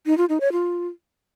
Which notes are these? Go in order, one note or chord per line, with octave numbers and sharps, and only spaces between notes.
D#4
F4
D#4
C#5
F4